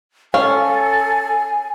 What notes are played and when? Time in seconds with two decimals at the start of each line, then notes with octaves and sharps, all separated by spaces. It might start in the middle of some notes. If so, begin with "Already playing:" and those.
0.34 C#4 A4 F5 G#5